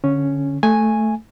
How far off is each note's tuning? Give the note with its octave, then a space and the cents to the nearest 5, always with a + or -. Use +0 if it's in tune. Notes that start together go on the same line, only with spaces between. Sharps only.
D3 -15 C#4 +0
A3 +0 G#5 +0